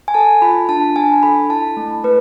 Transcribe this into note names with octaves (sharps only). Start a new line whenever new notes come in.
G#5
A4 A5
F4 B5
D4 A5
D4 G#5
A4 B5
E4 A5
A3
A3 B4